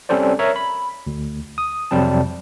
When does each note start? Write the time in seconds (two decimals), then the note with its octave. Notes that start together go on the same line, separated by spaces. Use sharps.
0.09 G3 C4 C#4 A4 C5 D5
0.39 A#4 C#5 E5 A#5
0.56 B5
1.07 D2
1.58 D#6
1.91 F2 C3 F#3 G3 C4 A5